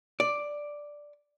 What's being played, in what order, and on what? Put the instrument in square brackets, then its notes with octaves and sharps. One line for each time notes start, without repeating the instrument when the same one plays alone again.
[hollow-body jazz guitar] D5